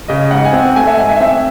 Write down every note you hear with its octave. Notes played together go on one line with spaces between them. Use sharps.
C#3 D#5
G#2 F#5
G#5
C4 F#5
A3 G#5
E5
G#2 G#5
E5
C4 E5